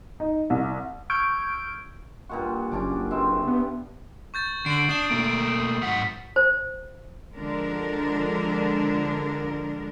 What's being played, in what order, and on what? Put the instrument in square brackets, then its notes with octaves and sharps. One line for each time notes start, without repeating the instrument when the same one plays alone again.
[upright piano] D#4
C2
[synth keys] C#6 E6 F6 G6 G#6 D7
[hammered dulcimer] G2 A#2 F#4
[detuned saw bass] F#1 [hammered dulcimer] C#4 D4 D6
[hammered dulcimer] G2 C4 E5
[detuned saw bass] B3
[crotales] C#6 G6 A6
[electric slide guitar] D3 [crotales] C7 E7 F#7 [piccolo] D7
[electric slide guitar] D4 [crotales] D#6 E7
[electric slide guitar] B2 A3 A#3
[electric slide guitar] G#2 F#3 F#5 [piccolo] B6
[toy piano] C5
[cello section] D3 F3 G#3 D4 A#4